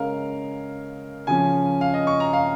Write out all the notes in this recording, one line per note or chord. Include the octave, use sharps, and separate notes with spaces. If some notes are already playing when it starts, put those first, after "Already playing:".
Already playing: C#3 G#3 C#4 A#4 F5
C#3 F3 C#4 G#5
F5
D#5
C#6
A#5
F5